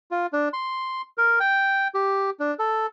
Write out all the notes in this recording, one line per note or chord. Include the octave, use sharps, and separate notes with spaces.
F4
D4
C6
A#4
G5
G4
D4
A4